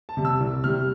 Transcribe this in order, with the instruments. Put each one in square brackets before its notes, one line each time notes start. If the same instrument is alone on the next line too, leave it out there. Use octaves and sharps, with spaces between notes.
[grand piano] A5
C3 G3
E6
C2
C3 G3 F6